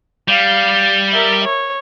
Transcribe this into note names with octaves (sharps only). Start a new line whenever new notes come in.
G3 F5
A#4 E5
C#5